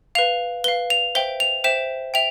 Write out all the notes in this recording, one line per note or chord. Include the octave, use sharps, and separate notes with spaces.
B4 F5 F7
B4 F5 G7
F7
C5 E5 G5 G7
F7
C5 E5 G5 E7
E5 G5 F7